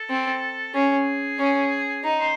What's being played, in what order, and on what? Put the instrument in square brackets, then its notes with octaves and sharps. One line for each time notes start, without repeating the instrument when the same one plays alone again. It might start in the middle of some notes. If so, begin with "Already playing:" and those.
Already playing: [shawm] A4
[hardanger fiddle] C4
[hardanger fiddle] C#4 [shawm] G#4
[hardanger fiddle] C#4
D#4
[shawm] C5